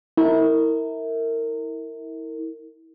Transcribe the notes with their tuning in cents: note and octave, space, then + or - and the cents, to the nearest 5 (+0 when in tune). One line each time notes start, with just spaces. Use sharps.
E4 -30 A#4 -25